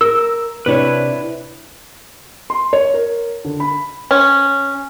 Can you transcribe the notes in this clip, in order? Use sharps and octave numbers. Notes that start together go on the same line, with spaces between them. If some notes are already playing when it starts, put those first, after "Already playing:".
A#4 E6
C3 D4 E4 B4 C#5
C6
C#5
A#4
D3
B5
C#4